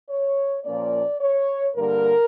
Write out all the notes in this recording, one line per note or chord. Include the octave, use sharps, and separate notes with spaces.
C#5
A#2 F3 A#3 C#4 D5
C#5
G2 D3 G3 A#3 A#4